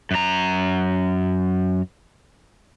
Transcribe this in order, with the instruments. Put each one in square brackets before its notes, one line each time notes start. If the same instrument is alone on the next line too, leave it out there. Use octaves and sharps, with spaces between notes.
[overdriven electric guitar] F#2 A#5